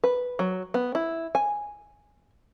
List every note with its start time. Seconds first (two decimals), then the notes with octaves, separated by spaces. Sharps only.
0.04 B4
0.39 F#3
0.74 B3
0.95 E4
1.35 G#5